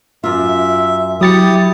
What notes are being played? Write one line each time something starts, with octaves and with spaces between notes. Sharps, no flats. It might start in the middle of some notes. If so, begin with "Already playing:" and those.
F#2 F4 E5
F#3 E4 G4 D#6 A6 C#7